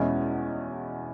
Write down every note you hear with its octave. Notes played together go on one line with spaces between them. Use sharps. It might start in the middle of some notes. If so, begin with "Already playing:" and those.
Already playing: E2 B2 G#3 C#4 E4